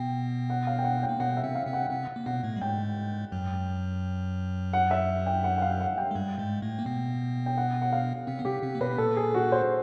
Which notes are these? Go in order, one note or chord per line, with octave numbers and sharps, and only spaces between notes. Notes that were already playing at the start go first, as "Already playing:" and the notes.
Already playing: B2 B3 G5
F#5
F5
G5
F#5
G5
A#3
B2 B3 F#5
E5
C3 C4
F5
C3 C4
F#5
C3 C4 F#5
A#3
B2 B3 F#5
A2 A3
G3
G#2 G#3 G5
F#2 F#3
F#5
E5
G5
F#5
F#5
F5
F#5
G5
G#3
G2 G3
G#2 G#3
A2 A3
A#3
B2 B3
G5
F#5
F#5
F5
C3 C4
B3
C3 C4 G4
C3 C4
A#3
B2 B3 B4
B3
A#2 A#3 A4
G#4
F#4
C5